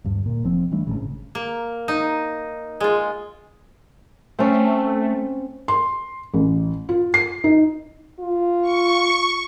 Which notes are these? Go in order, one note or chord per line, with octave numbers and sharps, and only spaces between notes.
D2 G2
A#2
F1 F3 C4
E3 G3 A3 D4
G#1 C#2 A2 C#3
A#3
D#4
G#3 F4
A3 C4 C#4
C6
A1
F4
C7
D#4
F4
C#6